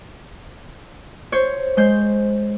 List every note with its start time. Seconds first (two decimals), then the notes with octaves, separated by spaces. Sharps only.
1.32 C5 C#5
1.77 G#3 C5 G6